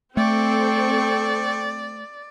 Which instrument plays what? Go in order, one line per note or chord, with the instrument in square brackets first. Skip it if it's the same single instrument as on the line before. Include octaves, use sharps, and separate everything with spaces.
[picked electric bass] A3 [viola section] C4 A4 [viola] D5 [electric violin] G5 C#6